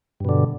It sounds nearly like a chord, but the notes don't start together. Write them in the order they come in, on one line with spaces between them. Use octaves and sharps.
G2 B2 D3